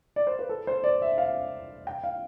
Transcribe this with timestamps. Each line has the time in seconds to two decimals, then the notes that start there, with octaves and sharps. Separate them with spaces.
0.16 D5
0.27 C5
0.39 B4
0.49 A4
0.67 C5
0.84 D5
1.02 E5
1.18 F5
1.87 G5
2.04 F5